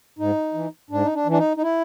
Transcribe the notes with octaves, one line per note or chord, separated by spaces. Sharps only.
G#2 D#4
E3
G#2 D4
D#4
D4
E3
D4
D#4
D#4
E4